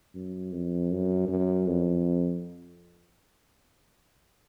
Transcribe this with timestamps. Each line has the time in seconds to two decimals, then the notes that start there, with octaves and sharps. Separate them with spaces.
0.14 F#2
0.52 F2
0.91 F#2
1.28 F#2
1.67 F2